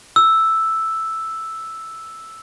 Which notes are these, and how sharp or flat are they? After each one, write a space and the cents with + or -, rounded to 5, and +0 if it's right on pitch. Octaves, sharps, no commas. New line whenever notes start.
E6 +0